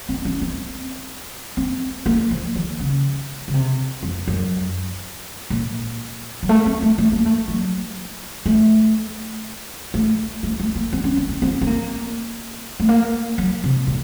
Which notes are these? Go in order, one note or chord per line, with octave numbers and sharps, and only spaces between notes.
C4
C#4
C4
C4
A#3
F3
D#3
C#3
C#3
C3
F2
F#2
A#2
F#3
A3
C4
A3
A3
A#3
A3
F#3
A3
A3
A3
A3
A#3
C4
C#4
C4
C4
C4
C4
A#3
A3
A#3
F#3
C3
A#2